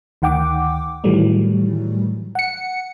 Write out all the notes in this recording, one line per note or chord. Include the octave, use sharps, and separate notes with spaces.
D2 D#3 F#5 G5 D6
A2 D#3 E3 F#3 G3 A3
F#5 C#7